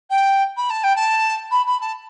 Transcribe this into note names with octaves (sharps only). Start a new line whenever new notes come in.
G5
B5
A5
G5
A5
B5
B5
A5